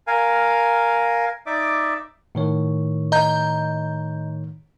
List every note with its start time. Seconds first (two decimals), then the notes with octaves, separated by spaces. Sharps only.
0.07 A#4 F5 G#5
1.46 D#4 D5 E5 D6
2.35 A2 D#3 C#5
3.12 D#5 A#5 G6